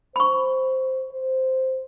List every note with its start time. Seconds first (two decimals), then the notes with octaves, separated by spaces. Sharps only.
0.16 C5 B5 C#6
1.12 C5